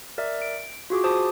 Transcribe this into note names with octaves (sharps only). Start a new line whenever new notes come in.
A#4 D5 E5
D7
F4 F#4 G#4 D6
G#4 C5 A5 D6 D#6